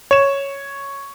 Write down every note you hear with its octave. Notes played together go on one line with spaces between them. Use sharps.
C#5 E7